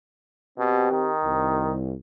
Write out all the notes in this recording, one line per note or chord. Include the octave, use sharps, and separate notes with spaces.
B2 C4 G4
D#3
C2